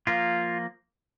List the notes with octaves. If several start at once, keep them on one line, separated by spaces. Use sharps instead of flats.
F3 A#3 F4